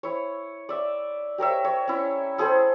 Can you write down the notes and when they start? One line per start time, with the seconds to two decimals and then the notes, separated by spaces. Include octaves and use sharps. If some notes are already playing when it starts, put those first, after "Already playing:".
0.03 E4 C#5
0.69 D5 E5
1.38 G4 A#4 C#5 E5
1.65 C#5
1.88 C#4 E4
2.38 E4 G#4 A4 C5